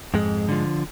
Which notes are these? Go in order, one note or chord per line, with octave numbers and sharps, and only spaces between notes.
F2 G#2 G#3
D3 F3